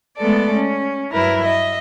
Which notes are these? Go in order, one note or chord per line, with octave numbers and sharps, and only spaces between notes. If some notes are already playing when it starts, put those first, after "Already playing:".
G#3 A3 B3 A4 D5
C#4
G2 F#3 E4 A#4 B4
D#5 E5